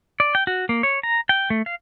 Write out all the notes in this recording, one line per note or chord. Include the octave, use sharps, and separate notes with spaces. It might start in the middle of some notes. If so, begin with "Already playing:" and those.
D5
G5
F#4
A#3
C#5
A#5
G5
A3
F5